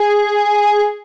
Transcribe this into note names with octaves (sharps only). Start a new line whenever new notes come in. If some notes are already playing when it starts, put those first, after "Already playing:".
Already playing: G#4